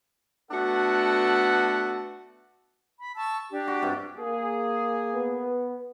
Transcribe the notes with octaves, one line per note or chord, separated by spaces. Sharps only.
A3 B3 D4 F#4 A4 F#5
B5
A5 C#6 E6
D4 G4
F#4
G2 C3
A#3 G#4
B3